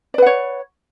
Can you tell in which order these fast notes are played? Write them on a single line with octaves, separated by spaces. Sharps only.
D5 B4 F#5 C#5